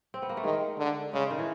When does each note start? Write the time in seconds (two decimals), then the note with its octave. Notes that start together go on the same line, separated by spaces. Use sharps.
0.14 C4
0.22 B3
0.29 A#3
0.37 A3
0.44 D#3 G#3
0.78 D3
1.13 C#3 G#3
1.30 D#3
1.39 E3